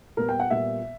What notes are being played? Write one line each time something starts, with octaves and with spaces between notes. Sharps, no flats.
A#2 G3 B3 A#4
G5
F#5
A#2 G3 B3 E5